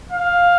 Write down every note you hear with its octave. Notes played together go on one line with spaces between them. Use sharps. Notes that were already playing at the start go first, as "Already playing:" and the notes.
F5